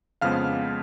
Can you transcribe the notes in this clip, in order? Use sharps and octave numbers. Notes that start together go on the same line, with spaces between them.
F2 C#3 F3 G#3 B3 F5 F6